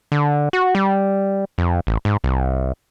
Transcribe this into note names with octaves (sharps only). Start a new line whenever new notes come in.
D3
F#4
G3
F2
A1
G#2
C2